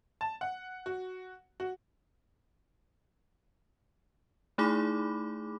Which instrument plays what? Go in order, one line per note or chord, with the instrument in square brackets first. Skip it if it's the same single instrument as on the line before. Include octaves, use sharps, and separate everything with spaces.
[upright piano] A5
F#5
F#4
F#4
[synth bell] A3 D#4 E4 G#4 B5 D6